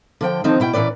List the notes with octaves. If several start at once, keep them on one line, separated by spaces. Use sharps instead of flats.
D3 F3 G5
D3 D#3 F3 C4 D#4
B2 E4 G5
A#2 E3 C#4 B4 D5